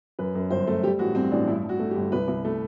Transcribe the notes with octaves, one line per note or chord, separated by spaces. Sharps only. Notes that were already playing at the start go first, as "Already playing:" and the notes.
F#2 B4
F#2
G1 C5
A3
G3 G4
A1 F#4
G2 C4
A1 D4
G2 E4
G2
F#4
A3
G4
G1
C2 B4
C2
A3